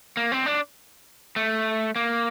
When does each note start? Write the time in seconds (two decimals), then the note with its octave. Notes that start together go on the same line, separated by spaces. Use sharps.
0.17 A#3
0.32 C4
0.46 D4
1.36 A3
1.96 A#3